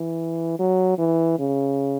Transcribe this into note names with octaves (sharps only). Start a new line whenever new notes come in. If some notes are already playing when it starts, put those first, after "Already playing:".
Already playing: E3
F#3
E3
C#3